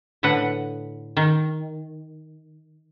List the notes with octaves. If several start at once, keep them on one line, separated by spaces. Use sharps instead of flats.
A2 D3 B4 F#5
D#3